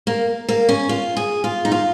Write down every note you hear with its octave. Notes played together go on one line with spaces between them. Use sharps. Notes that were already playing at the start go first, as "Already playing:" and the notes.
A#3
A#3
C#4
F4
G#4
F4
D#4
F4